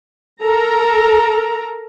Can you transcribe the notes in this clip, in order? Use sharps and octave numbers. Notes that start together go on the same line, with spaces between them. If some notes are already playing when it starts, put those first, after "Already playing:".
A4 A#4 A#5